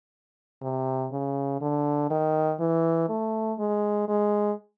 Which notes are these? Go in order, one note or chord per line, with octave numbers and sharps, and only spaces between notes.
C3
C#3
D3
D#3
E3
A3
G#3
G#3